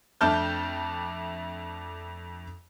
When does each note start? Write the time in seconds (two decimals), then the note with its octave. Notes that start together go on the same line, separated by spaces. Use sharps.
0.21 F2 A3 D4 A5 F6 G6